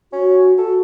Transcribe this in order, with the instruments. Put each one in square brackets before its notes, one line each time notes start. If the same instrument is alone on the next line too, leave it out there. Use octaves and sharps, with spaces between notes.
[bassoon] C#4 [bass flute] F#4
[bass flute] F#4 [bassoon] A4